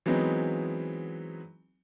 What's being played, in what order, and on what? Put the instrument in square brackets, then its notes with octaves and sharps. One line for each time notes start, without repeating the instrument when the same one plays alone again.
[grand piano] E3 F#3 G#3 B3 C4 D#4